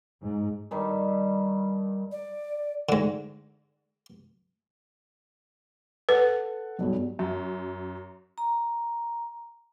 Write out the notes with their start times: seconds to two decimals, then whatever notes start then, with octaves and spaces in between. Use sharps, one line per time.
0.23 G#2
0.71 G2 D#3 G3
2.12 D5
2.89 G#2 D3
6.09 A4 B4 F#5
6.78 B1 G2 B2
7.19 F#2
8.38 A#5